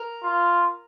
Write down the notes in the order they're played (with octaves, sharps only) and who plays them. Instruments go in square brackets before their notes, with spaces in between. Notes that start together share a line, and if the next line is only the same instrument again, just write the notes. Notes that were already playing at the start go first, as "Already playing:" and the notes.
Already playing: [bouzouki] A#4
[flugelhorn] F4